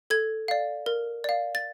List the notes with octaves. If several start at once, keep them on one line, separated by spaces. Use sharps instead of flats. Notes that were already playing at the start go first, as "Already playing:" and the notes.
A4 G#6
D5 F5
A#4
D5 F5
A6